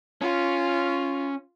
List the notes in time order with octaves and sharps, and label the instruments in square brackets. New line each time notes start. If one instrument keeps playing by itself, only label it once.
[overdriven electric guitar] C#4 [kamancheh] F4